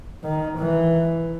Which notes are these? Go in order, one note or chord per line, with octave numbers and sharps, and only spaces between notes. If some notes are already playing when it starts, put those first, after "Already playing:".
D#3
E3